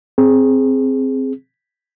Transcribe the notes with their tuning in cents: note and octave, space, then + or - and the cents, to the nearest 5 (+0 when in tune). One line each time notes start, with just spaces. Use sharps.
C4 +0 G#4 +0